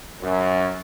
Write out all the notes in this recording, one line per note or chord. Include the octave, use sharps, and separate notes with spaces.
F#2